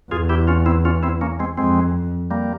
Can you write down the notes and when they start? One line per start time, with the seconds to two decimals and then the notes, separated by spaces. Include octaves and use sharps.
0.11 E2 F4 G#4
0.29 E4 G4
0.48 C#4 F4
0.66 C4 E4
0.85 C#4 F4
1.03 C4 E4
1.21 A#3 C#4
1.40 G#3 C4
1.57 F2 G#3 C4
2.31 G3 A#3